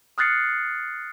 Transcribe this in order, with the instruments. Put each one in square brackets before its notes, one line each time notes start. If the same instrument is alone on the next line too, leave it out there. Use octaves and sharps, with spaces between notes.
[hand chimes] D#6 F6 F#6 A6 C7 C#7